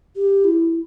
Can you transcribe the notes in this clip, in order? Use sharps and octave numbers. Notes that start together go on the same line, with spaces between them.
G4
E4